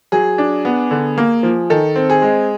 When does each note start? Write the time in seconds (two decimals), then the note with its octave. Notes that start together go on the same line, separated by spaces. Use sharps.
0.12 F#3 G#4
0.38 D4
0.65 B3
0.91 D3
1.18 A#3
1.43 F3
1.70 D#3 A4
1.96 C4
2.10 G#4
2.22 G#3